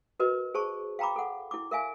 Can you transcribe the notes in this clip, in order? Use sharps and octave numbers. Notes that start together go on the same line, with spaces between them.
F#4 A#4 B4 D#5
G#4 C5 A5 C#6
F5 G5 A#5 B5 D6
A4 F#5
E4 D6
A#4 E5 F5 G#5